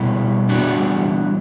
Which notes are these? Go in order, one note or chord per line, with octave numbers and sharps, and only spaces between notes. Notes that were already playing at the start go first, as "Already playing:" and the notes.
Already playing: B2 G3 B3 E4
E3 G3 B3 D4 F#4